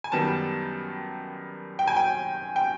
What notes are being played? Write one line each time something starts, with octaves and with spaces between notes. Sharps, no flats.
G#5
F#2 D#3 G3 B3 A5
G5
G#5
G5
G5